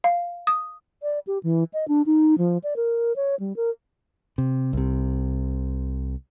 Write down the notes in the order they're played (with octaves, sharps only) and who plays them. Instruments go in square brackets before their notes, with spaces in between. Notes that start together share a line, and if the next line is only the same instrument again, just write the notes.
[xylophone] F5
D#6
[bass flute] D5
G4
E3
D#5
D4
D#4
F3
D5
A#4
C#5
G3
A#4
[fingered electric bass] C3
C2 C3